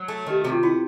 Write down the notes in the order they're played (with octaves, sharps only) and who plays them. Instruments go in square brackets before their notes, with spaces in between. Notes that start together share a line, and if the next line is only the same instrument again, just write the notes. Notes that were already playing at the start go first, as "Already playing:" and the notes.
Already playing: [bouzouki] F#3
A3
[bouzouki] D#3 [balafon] G4
[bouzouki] C3 [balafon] F#4
[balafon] F4
[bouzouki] B3 [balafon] E4